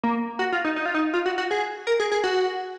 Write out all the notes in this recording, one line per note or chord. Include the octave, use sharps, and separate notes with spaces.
A#3
F#4
F4
D#4
D#4
F4
D#4
F4
F#4
F#4
G#4
A#4
G#4
G#4
F#4